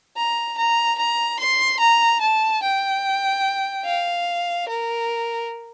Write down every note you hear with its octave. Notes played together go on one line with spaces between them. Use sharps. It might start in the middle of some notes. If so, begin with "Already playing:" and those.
A#5
A#5
A#5
C6
A#5
A5
G5
F5
A#4